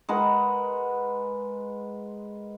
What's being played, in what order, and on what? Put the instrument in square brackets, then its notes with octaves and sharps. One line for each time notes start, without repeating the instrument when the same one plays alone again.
[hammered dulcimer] G#3 A#4 B4 F#5